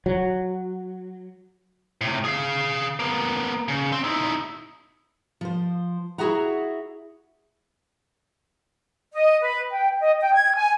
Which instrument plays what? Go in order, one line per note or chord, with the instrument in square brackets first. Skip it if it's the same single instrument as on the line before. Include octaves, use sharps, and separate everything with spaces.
[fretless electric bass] F#3
[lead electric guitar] A2 C3
G#4 F5
A#3 B3
C#3
C4
D#4 E4
[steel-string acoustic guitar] F3 C5
E4 F#4 G#4 E5 F#5 A#5
[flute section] D#5
B4
G5
D#5
G5
G#6
G#5